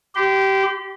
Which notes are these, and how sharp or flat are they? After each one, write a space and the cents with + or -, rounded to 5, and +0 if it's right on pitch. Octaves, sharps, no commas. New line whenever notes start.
G4 -20 C6 -40